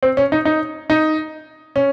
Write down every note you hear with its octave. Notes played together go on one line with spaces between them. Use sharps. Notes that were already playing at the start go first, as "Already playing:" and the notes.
C4
C#4
D#4
D#4
D#4
C#4